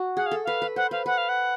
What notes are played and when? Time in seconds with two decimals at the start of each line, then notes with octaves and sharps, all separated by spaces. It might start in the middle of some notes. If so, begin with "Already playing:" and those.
Already playing: F#4
0.17 G#4 F#5
0.26 F5
0.31 A4
0.44 B4 F5
0.62 B4
0.76 C5 F#5
0.91 B4 F5
1.06 B4 F#5
1.18 F5
1.29 F#5